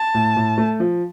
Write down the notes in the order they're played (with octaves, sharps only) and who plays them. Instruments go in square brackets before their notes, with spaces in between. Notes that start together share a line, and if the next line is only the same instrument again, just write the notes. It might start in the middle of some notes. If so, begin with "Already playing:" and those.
Already playing: [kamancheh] A5
[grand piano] A2
A2
A3
F3